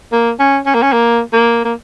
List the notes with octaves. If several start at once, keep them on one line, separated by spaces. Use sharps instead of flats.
A#3
C#4
C#4
A#3
C#4
A#3
A#3
A#3